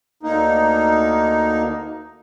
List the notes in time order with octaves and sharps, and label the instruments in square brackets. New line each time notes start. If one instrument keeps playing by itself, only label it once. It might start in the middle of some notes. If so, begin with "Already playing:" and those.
[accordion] D2 A#3 D#4